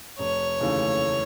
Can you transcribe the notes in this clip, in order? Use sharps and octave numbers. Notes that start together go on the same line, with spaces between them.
F1 C#5
D#2 C#3 E3 A3